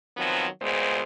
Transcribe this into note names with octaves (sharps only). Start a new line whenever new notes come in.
D#3 F3 F#3 B3 C4
D2 A#2 G#3 B3 C5